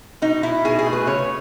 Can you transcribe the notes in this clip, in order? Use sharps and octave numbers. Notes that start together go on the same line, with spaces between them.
B2 D#4
B2 E4
B2 G#4
G#4
A3
B4
C#3 C#5